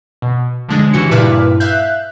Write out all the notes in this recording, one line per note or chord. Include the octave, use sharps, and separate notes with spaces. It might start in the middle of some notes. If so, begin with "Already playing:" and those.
B2
D3 F3 G#3 D4
C#3 E3 F#4 G4 C#7
G2 A#2 E4 B4 D6 F6
E5 F5 F#6 G6